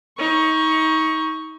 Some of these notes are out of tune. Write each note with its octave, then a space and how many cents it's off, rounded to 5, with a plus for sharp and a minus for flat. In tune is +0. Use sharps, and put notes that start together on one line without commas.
D#4 +30 C#6 +0